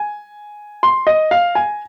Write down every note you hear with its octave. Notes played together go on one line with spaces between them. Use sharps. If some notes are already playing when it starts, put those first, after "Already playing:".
Already playing: G#5
C6
D#5
F5
G#5